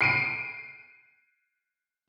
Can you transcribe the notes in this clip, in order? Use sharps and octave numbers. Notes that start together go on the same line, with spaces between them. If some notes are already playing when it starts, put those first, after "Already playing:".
C7 D7 D#7